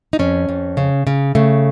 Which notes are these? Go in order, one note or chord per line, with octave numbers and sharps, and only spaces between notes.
D#4
F2 C#4
F2
C#3
C#3
C#3 A3